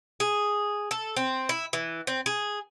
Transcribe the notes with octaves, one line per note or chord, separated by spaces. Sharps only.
G#4
A4
C4
E4
E3
C4
G#4